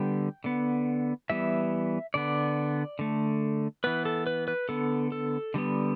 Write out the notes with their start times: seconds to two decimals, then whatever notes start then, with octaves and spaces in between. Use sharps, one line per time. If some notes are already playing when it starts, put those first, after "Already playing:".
Already playing: D3 G3 B3 G5
0.44 D3 B3
1.30 E3 G3 B3 E5
2.14 D3 B3 D5
2.99 D3 A3
3.84 E3 B3 B4
4.05 A4
4.27 B4
4.48 B4
4.69 D3 B3 A4
5.12 A4
5.54 D3 G3 B3